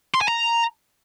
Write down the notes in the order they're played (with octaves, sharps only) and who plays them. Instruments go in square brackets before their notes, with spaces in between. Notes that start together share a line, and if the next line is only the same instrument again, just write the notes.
[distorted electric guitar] C6
G#5
A#5